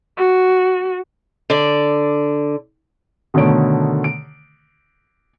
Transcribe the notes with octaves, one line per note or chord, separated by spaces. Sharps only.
F#4
D3 D5
B2 D3 D#3 A3 C#5 D7
D7